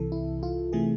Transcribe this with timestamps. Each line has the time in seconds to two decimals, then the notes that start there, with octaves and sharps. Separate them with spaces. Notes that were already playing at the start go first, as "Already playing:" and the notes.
Already playing: C2 C3 E3 A4
0.12 E4
0.43 F4
0.73 C3 E3 A3 G#4